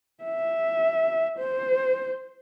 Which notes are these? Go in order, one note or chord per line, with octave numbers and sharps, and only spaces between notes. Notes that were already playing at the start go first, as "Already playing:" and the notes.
E5
C5